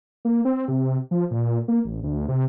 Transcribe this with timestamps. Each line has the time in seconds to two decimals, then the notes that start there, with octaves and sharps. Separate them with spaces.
0.25 A#3
0.45 C4
0.68 C3
1.11 F3
1.31 A#2
1.68 A#3
1.85 A1
2.03 D2
2.29 C3